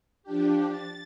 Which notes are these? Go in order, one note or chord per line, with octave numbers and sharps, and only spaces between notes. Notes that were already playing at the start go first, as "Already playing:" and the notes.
F3 D4 G4
A6